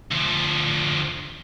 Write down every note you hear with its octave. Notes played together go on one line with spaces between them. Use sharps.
D2 F3